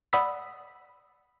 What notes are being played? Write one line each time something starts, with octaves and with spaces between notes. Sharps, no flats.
D5 F#5 B5 D#6 E6 B6